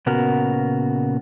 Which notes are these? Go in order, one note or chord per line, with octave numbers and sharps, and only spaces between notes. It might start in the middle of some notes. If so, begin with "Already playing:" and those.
A#2 C#3 B3 F#4 A#4